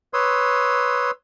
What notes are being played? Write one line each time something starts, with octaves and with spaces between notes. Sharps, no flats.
B4 C#5 C6 D#6 E6